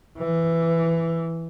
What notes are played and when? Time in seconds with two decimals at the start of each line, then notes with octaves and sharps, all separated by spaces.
0.18 E3